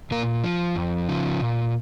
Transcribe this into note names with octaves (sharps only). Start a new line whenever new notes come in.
A#2 A#3 A#4
F3
F2
C#3 F3
A#2